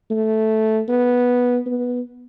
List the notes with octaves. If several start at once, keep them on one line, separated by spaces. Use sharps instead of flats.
A3
B3
B3